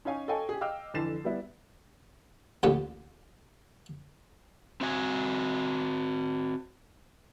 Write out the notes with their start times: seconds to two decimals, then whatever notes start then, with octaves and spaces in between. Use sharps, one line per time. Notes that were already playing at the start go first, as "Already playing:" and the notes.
0.05 C#4 D#4 C#5 F5 G#5
0.28 A4 C#5 D#5 F5 G5 G#5
0.49 G4 G#4
0.61 D#5 F5 G5 D6 E6 F6
0.94 F2 D3 E3 A6 C7 E7
1.24 G3 B3 E4
2.63 A1 D2 A#2 A3 G4 F#5
4.81 C4 F#4 G#5